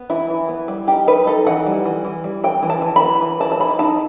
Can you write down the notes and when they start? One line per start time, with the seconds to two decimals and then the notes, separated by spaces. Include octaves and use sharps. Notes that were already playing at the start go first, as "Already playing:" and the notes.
Already playing: B3
0.10 E3 E4
0.30 E3
0.49 B3
0.68 G3
0.88 D#4 G4
1.07 D#4 B4
1.27 D#4 A4
1.47 E3 F#5
1.66 G3
1.85 E3
2.05 E3
2.24 G3
2.44 E3 G5
2.63 E3
2.70 A5
2.82 E3
2.96 B5
3.02 B3
3.21 E3
3.40 E3 A5
3.52 A5
3.60 D#4 B5
3.79 D#4 A5